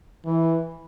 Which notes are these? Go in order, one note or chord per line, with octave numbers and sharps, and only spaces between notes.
E3